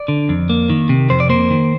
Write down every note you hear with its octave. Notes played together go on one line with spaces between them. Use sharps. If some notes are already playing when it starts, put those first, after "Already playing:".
Already playing: D5
D3
F2
A#3
D#3
C3
F2 C5
D5
A#3 C5
D#3